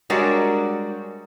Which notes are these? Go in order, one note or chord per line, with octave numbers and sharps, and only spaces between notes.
G3 G#3 D4 F#4 A#4 C#5